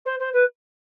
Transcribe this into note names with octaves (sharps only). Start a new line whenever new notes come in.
C5
C5
B4